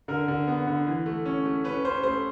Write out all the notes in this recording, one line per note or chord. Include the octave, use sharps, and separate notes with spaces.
D3 A#4
D3
B3
D3
E3
A3
C#4
A3
C#4 B4
C#4 C5
A3 C5